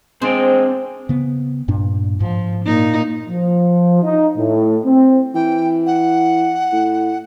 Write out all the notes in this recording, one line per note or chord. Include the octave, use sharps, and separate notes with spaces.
G#3 C4 D4 C5 G5
C#3 B3
G2 A#2 D4
G#2 F3
A#2 D#4
F3
D#4
A2
C4
E3 G5
F#5
A2